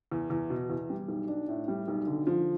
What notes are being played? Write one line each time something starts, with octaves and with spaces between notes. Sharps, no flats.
E2
E2
B2
E2
G3
B1
D4
A2
G3
B1
D3
F3